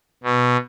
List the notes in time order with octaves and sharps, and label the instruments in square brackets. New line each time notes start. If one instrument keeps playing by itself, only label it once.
[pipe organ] B2